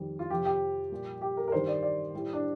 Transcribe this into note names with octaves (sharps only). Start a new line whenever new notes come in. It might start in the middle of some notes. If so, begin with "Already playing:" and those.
Already playing: F2 D#3 G3
F4
F2 C3 F3 G4
G4
A#2 G3
G4
A#4
A#4
G2 D#3 G3 C5
D5
D5
A2 G3
D4